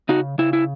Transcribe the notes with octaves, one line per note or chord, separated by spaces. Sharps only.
C#3 D#4 F#4
C#3 E4
E4